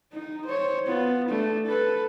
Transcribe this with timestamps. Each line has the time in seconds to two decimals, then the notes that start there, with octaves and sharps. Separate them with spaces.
0.13 D#4
0.46 C5 C#5
0.87 B3 F4
1.29 A3 D4
1.66 A4 B4